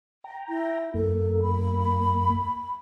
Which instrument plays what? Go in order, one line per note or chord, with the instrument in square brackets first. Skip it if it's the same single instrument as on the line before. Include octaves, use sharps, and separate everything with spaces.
[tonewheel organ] G5 A#5
[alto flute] E4
[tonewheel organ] F#2 A#3 [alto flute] A4
[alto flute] B5